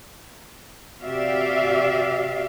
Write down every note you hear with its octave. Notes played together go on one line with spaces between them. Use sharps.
C3 F#4 G4 D5 E5 F5